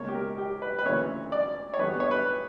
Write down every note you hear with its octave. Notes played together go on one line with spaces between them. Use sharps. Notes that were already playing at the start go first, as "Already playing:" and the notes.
Already playing: C#2 B2 A#3 C#5
G4
A#4
G4
B4
B4
D2 C#3 E3 A#3 C#5
D5
C#5
E2 D3 G3 B3 B4
C#5
B4